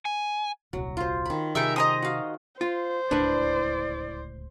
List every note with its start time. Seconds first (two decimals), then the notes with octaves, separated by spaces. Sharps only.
0.05 G#5
0.73 D#1 C2 F#3
0.97 F4 C5
1.26 D#3 B5
1.55 C3 D#3 G3 D#4 G#4 A#4 E5
1.76 C5 D#5 A#5 D#6
2.02 F#4 F5
2.61 F4 C5
3.11 D1 C#2 A2 D4 E4 B4 D5